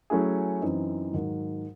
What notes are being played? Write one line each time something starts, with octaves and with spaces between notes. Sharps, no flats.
F#3 A3 C#4 E4 G#4
F#2 E3 C4 D#4
G#2 D#3 F#3